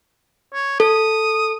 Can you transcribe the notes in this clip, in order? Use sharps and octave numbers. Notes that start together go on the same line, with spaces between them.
C#5
A4 D#6